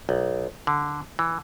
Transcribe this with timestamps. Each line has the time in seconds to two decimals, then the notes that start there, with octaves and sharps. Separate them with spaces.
0.09 B1
0.67 D3
1.19 E3